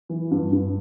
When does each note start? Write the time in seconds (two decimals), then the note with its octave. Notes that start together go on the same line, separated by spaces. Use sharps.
0.09 E3
0.31 G2
0.52 G2